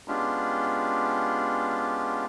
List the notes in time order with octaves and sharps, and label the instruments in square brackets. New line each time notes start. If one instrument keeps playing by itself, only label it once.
[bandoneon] G#3 B3 C#4 D4 F4 G4